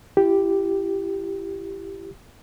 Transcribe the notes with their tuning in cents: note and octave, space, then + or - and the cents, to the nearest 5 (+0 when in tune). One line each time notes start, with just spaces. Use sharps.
E4 +35 G4 +0